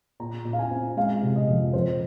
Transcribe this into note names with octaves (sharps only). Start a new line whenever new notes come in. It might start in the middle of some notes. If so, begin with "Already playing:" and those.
A#2 A#5
A#2
F5
G#5
C4
G#3 F5
C3
D#5
F2
F2 C5